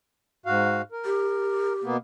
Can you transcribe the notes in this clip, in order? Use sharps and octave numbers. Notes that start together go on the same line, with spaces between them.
G#2 F#4 F5
A#4
G4
B2 A#3 B3